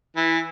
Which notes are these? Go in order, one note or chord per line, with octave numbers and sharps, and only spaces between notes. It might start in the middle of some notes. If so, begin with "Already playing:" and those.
E3